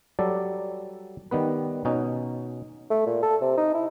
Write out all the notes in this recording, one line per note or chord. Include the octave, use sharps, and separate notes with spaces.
F#3 G3 A4 D5
D#3 G3 B3 B4
B2 C#4 D#4
A3
A#2
A4
C3
D#4
E4